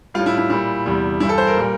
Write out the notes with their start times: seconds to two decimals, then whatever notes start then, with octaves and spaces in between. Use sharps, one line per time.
0.14 G3 F4
0.19 A2
0.26 E4
0.38 E4
0.50 A#2 G3 E4
0.86 E2 C3 G3
1.20 G2 E3 G3 E4
1.29 A4
1.38 C5
1.47 A#4
1.56 A#2 G3